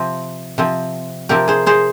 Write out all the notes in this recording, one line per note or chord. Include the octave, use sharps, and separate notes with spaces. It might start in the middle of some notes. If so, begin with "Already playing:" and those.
Already playing: C3 F3 C4
C3 F3 C4
C3 F3 C4 G4 A#4
G#4 C5
G#4 C5